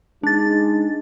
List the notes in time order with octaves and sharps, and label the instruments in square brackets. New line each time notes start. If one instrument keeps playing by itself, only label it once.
[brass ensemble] G#3 D#4 [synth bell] D4 A6